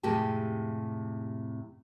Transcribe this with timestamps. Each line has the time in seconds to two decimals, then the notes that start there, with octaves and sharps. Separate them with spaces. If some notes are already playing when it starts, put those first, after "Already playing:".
0.03 F2 A2 C3 G#3 G4 A5